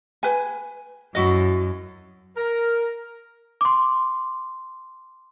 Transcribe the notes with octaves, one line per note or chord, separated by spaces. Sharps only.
B4 G#5
F#2 E4 F#4 D#5
A#4
C6 D6